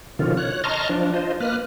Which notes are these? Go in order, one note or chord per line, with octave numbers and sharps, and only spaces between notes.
B2 D3 D#3 F3 C#4 F4
C#5 F#6
D#5 A5 A#5 C6 C#6 F6
F3 D4
F4 C5 D#5
A#3 B4 F6 F#6